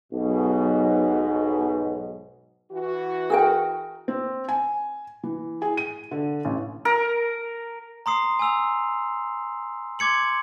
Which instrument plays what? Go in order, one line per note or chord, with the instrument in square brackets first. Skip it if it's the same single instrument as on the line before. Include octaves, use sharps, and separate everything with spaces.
[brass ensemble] B1 G#2 B2
[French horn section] E3 F#4
[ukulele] G#4 A#4 G5
[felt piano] C4
G#5
E3
G#4
D#7
D3
A1
[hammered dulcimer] A#4
[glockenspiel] A#5 C6 D#6 C7
G#5 D#6 E6 F7
C6 D6 G#6 C#7 F#7